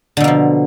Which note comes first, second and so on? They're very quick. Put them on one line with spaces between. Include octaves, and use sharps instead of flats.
D3 B2 A#3 F3